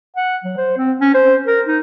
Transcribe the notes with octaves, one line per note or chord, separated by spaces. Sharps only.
F#5
F#3
C5
C4
C#4
C5
A#4
D#4